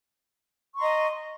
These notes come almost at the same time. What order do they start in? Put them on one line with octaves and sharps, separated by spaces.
C#6 C6 A#5 D#5